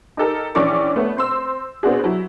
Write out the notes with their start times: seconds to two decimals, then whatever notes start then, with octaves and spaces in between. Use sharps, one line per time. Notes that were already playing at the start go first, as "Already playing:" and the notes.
0.17 D#4 G4 A4 A#4
0.55 A#1 E3 C#4 D5 C#6 D6
0.96 A3 B3 C#5
1.17 C4 C6 E6
1.83 B3 C4 D4 F#4 G#4
2.04 F#3 E4